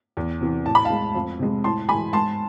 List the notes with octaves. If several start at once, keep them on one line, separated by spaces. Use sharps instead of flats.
E2
C3 E3
A2 A5
B5
F5 A5
G#3
F2
C3 G#3
A2 A5 C6
E3 G#3 G#5 B5
G#2 A5 C6